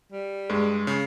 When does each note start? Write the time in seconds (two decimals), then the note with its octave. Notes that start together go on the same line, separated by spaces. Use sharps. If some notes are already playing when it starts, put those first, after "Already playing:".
0.12 G3
0.50 G2 G#3
0.87 C#3